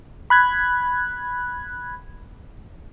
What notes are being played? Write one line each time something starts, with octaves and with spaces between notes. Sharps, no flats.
B5 F#6 G#6